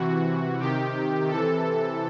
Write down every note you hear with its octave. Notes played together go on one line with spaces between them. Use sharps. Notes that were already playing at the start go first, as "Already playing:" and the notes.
Already playing: C3 E3 F#4
C3 D#3 G4
C3 E3 A4